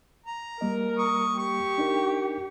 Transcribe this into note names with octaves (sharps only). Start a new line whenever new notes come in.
A#5
G3 A#3 A#4 D#5
C#6 D#6
G4 C#6
D4 D#4 A#4